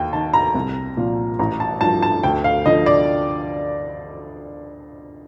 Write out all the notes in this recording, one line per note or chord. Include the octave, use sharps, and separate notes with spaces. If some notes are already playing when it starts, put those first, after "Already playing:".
Already playing: D#2 G5
D#3 A5
A#5
C2
A#2 F3
A1 A#5
A5
G2 F3 A5
A5
D2 G5
F5
D3 F3 D#5
D5